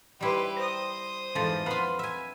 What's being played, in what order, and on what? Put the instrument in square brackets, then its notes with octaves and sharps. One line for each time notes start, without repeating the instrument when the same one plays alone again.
[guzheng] G3 E4 [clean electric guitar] D#4 C5 [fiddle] G4 B4
[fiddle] C5 D#6 [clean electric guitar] A#5
[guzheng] F2 E3 F3 [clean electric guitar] G#2 F4 A5
[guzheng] B3 F4 [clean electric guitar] A#4 B4 C6
[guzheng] E5 G#5